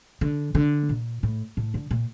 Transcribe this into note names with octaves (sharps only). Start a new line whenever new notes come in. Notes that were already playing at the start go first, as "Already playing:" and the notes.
D3
D3
A#2
A2
A2
D3
A#2